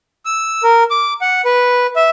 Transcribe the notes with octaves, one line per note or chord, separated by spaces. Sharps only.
E6
A#4
D6
F#5
B4
E5